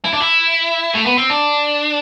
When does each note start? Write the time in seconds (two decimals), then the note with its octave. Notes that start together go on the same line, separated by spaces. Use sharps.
0.05 E4
0.13 D4
0.22 E4
0.95 A3
1.06 B3
1.18 C4
1.30 D4